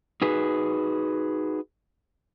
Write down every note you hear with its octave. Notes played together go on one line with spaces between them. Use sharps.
D#4 F#4 G#4 B4